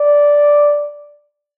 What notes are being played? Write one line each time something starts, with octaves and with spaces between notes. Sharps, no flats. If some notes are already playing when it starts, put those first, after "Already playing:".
Already playing: D5